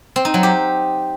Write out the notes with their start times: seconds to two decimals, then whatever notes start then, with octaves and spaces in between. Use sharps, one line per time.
0.16 C4
0.25 D#4
0.34 F#3
0.43 G4